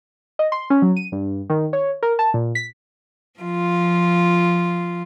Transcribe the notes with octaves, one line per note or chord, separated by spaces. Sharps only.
D#5
C6
C#4
F#3
D#7
G2
D#3
C#5
A#4
A5
A#2
B6
F3 F4